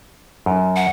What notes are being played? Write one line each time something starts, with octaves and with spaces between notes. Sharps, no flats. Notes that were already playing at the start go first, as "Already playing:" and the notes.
F#2
F#5